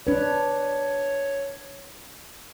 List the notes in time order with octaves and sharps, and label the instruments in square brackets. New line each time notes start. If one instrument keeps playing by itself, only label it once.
[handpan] D4 B4 [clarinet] C#5